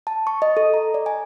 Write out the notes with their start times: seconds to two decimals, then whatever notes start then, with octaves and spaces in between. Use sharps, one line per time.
0.07 A5
0.27 C#6
0.42 D#5
0.57 A4
0.74 A#5
0.94 D5
1.06 G#5